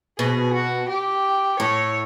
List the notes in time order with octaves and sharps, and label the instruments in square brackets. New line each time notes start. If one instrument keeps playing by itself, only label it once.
[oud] B2 [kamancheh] G#4
[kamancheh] F#4
G4
[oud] A2 [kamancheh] C#5